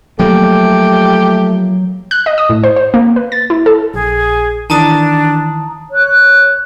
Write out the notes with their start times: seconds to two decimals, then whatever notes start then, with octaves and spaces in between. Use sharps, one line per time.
0.19 F3 F#3 A3 A#3 G4
2.11 F#6
2.26 D#5
2.38 D#6
2.49 A2
2.64 C5
2.76 C5
2.94 A#3
3.16 B4
3.32 A6
3.50 E4
3.66 A4
3.94 A#1 G#4
4.70 D#3 E3 D4 A5 A#5 D#6
5.91 C#5 F#6